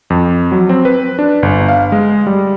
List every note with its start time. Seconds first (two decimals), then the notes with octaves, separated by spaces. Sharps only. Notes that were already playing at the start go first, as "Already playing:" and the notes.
0.10 F2
0.52 F#3
0.69 C4
0.85 B4
1.19 D4
1.43 G1
1.68 F5
1.92 G#3
2.27 G3